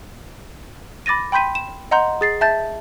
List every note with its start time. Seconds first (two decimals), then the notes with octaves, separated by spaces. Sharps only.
1.06 B5 D6 A6 A#6 D#7
1.32 G5 B5 C6 G6 B6 D#7
1.55 E7
1.91 D#5 F#5 A#5 C6 G6
2.21 G#4 A6 C7
2.41 E5 A5 G6 A6